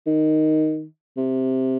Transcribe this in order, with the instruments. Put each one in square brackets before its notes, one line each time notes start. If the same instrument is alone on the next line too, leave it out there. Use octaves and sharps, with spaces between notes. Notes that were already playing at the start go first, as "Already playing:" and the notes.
[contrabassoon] D#3
C3